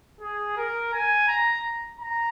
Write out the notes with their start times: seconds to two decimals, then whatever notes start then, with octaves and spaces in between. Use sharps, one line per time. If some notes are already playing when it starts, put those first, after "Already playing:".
0.21 G#4
0.57 A#4
0.93 G#5
1.28 A#5
2.00 A#5